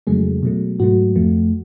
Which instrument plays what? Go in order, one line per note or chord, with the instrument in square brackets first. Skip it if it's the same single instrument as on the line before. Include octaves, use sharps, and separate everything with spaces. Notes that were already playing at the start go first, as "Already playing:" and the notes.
[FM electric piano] F2 C#3 F#3 G#3 A3 G#4
B2 F#3 A3
G#2 F#3 A3 F#4
F2 F3 A3